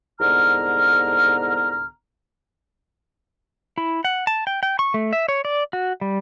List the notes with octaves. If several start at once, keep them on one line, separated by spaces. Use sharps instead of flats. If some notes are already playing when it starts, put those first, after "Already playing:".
C2 G#2 D3 B3 A#5 F6
E4
F#5
A5
G5
G5
C#6
A3
E5
C#5
D5
F#4
G3